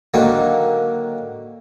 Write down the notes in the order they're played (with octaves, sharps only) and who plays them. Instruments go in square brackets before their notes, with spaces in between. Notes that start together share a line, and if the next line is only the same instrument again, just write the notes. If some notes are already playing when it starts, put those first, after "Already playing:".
[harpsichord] D3 D#3 F#3 A#3